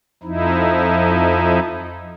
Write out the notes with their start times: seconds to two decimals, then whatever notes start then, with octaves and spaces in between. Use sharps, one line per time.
0.23 F2 F3 D#4 E4